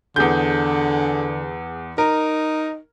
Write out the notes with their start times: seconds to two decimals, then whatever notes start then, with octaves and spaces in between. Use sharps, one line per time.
0.16 E2 D3 G#4 G6
1.98 D#4 A#4